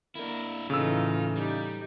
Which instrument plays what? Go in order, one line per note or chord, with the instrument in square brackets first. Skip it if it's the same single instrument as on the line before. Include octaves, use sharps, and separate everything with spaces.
[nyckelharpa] A#3 A#4 [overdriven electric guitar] D4 E4
[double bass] A2 E3 [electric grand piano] C#3 E6 [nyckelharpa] D#4 A4 [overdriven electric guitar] F4
[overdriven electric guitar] G3 [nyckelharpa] D#4 G4